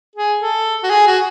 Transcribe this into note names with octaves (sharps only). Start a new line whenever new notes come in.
G#4
A4
F#4
G#4
F#4